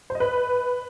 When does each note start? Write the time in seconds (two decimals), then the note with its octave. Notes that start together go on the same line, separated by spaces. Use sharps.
0.10 C5
0.15 D#5
0.20 B4